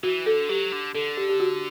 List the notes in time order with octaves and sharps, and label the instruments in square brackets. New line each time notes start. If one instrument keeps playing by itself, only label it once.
[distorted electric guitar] E3 [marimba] F#4
[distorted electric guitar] D3 [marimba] A4
[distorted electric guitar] F#3 [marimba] G4
[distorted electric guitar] D3
[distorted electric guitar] D3 [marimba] A4
[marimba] G4
G4
F#4